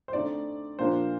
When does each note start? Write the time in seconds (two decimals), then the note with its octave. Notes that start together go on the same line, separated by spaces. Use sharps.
0.08 C5
0.13 D3 A3 C4 D#4 D5
0.79 A#2 F3 A#3 D4 C5